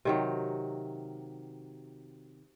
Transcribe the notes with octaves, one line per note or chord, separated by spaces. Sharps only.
C3 D#3 F#3